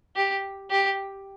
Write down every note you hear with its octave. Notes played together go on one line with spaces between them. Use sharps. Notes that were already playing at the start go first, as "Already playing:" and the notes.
G4
G4